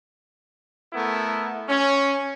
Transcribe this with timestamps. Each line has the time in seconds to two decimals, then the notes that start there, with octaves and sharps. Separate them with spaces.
0.93 A3 B3 E4 A#4
1.69 C#4